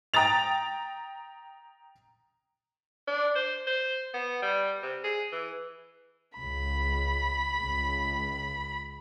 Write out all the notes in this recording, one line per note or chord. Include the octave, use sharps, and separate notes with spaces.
G5 A#5 D#6 A6 F7
D4
C5
C5
B3
G3
C3
G#4
E3
C#2 B5
C#2